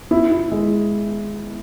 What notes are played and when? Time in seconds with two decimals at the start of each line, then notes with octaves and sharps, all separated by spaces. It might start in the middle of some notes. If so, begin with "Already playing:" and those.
0.11 E4
0.32 E4
0.52 G#3